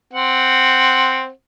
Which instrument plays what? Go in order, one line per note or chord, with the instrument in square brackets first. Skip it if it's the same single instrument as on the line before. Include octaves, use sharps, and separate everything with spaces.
[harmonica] C4 F#5